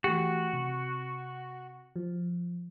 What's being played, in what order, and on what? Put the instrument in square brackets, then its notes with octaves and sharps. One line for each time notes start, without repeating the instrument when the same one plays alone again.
[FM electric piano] E3 A3 G4 [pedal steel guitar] F#4
[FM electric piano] C3
F3